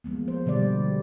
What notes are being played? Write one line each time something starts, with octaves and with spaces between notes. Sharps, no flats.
F3 G#3 A#3 B3
C5
B2 D3 G3 D5